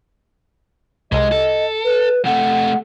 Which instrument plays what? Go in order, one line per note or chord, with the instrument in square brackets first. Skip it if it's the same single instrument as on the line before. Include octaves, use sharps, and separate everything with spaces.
[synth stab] C2 [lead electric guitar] G#3 [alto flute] D#5
[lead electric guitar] A4
[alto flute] B4
[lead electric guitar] C3 A3 [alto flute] F#5